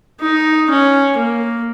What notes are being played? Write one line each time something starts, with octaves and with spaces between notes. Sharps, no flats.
D#4
C#4
A#3